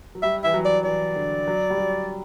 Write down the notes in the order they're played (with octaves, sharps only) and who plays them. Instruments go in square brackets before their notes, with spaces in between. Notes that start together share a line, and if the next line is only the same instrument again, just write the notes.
[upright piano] F#3
[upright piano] G3 [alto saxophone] E5
[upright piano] E3 [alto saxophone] E5
[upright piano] F#3
[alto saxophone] D5
[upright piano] E3 [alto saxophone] D5
[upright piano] D3
F#3
G3
F#3